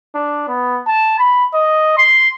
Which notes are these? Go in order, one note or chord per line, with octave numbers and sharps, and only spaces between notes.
D4
B3
A5
B5
D#5
C6